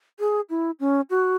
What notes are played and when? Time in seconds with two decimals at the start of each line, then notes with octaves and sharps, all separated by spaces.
0.20 G#4
0.50 E4
0.80 C#4
1.10 F#4